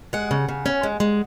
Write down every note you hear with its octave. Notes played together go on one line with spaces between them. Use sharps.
G#3 F#5
C#3
C#3
C#4
G#3
G#3